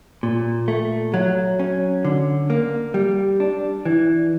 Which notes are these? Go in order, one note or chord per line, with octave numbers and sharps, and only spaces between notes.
A#2
A3
F#3
C#4
D3
A#3
G3
D4
E3